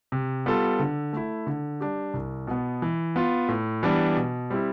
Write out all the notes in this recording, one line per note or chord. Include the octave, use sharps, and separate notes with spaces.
C3
G3 B3 F4 A4
D3
A3 E4
D3
G3 D4 G4
C2
B2 B3
E3
B3 F4
A2
E3 G3 B3 D4
B2
G3 C4 E4